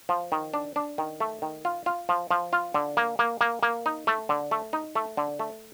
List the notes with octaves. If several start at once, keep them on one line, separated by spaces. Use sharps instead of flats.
F3
D#3
D4
D4
D#3
A3
D#3
F4
F4
F3
F3
F4
D3
A#3
A#3
A#3
A#3
D#4
A3
D3
A3
D#4
A3
D3
A3